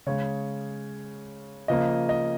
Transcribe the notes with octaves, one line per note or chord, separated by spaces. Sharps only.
C#3 G#3 C#5
C#3 F3 A#3 D#5
D#5